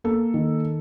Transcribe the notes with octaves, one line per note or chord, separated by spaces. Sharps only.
A#3 A4
D#3